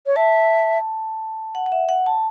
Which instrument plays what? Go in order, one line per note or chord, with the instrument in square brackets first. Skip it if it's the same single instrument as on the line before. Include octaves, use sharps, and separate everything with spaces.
[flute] C#5
[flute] E5 [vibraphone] A5
[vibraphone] F#5
F#5
E5
F#5
A5